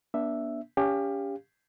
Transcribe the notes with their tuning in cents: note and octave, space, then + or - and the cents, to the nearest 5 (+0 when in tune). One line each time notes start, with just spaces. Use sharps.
B3 -45 D4 -5 E5 +0
C#4 +30 G4 +25 F5 +0